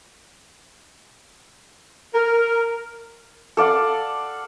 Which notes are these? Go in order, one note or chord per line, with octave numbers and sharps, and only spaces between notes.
A#4
A4 D5 F5 F#5